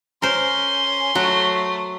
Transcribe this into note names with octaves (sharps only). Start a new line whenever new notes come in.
C#4 A#4 C5 C6
F#3 A3 F#4